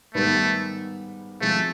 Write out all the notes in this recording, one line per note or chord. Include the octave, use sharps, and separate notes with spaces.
G#2 D#3 G3 A3 B3
F3 G#3 A3 C4 F4